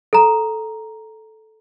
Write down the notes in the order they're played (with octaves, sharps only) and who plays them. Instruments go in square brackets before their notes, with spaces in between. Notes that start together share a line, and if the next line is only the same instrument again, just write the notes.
[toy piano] A4 A#5